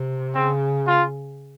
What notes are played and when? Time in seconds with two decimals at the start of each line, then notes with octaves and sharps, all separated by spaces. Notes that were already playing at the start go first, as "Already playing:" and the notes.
Already playing: C3
0.34 C#3 C4
0.87 F4